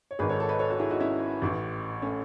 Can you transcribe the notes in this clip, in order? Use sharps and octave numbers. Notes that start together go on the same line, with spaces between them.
C#5
G#1 G#2 D#3 G#4 B4
A4 C#5
A4 C#5
B4 D#5
A4 C#5
F#4 A4
E4 G#4
D#4 F#4
C#4 E4
A1 A2 E3
A3 C#4